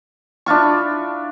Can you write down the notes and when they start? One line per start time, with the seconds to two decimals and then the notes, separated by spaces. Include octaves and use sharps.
0.46 D4 E4 F4 C#6